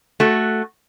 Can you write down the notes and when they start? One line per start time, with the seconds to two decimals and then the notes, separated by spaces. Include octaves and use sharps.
0.20 A3 F#4